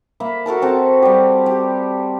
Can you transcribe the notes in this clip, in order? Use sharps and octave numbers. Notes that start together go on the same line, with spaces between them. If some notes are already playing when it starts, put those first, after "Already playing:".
A#3 E5 B5
F#4 A4 A#4 A5
C4 F#4 A4
G3 G4
G4